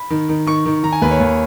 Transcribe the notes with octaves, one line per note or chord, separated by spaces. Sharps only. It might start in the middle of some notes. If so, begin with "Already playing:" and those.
Already playing: B5
D#3
D#3
D#3 C#6
D#3
D#3 A#5
G#5
D#2 B4
C#5
D#2